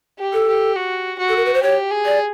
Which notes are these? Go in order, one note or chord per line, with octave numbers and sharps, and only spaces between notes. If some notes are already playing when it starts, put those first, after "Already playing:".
G4
A4
G4
F#4
F#4
A4
A#4
B4
C5
G4 C#5
G#4
D5